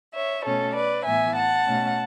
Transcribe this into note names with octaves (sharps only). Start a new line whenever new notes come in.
C#5 E5
B2 A3 C#4 A4 C#5
B4 D5
A2 E3 B3 E5 G#5
F#5 A5
B2 A3 C#4